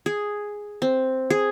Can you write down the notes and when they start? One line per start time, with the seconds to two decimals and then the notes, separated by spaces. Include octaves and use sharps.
0.06 G#4
0.82 C4
1.30 G#4